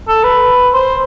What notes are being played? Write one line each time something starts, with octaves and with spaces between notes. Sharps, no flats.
A4
B4
C5